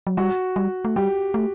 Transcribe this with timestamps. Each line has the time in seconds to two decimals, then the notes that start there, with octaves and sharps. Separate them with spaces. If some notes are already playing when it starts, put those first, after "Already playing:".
0.07 F#3
0.17 G3 F#4
0.56 G3
0.85 A3
0.96 G3 G4
1.34 A3